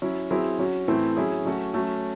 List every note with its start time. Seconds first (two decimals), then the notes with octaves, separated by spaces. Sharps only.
0.02 F#3 C#4 E4
0.31 F#3 C4 E4 G#4
0.59 F#3 C#4 F#4
0.88 A2 E3 A3 C4 E4
1.16 F#3 C#4 E4 G#4
1.45 F#3 A3 C#4 F#4
1.74 F#3 A3 C#4